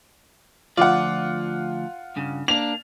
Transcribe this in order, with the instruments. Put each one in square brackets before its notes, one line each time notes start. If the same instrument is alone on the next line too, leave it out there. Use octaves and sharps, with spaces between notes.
[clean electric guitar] D2 F3 D5 [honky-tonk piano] F4 F#5
[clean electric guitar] G2 C#3
[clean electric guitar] A#3 D4 [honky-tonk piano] F7